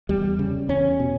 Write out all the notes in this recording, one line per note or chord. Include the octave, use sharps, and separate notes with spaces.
E2 G3
C#3
E2 C#4
B2